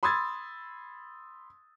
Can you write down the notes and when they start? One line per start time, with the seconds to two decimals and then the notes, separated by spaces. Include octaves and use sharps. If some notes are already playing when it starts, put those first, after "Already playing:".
0.03 B5 C6 D#6 E6 G#6 A6